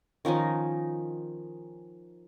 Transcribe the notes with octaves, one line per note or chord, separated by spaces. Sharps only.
D#3 F3 C#4 D#4